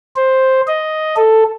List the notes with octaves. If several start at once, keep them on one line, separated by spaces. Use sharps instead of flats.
C5
D#5
A4